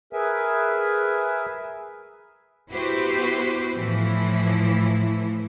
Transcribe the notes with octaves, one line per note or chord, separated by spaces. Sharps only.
G#4 A#4 B4 E5 G#5
B3 E4 F#4 G4 B4 C5
A2 E3 F3 E4